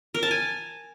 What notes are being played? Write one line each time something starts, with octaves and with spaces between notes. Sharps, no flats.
A#4
A5
G#5